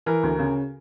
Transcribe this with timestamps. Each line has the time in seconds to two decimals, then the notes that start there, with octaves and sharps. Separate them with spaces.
0.06 E3 A#4
0.23 D2
0.39 C#3